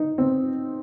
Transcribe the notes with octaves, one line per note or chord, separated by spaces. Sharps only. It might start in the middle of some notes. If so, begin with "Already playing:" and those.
Already playing: D#4
C4